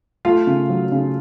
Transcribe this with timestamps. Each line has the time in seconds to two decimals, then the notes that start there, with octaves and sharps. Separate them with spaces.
0.25 A3 F4 F5
0.47 C#3
0.69 F#3
0.92 C#3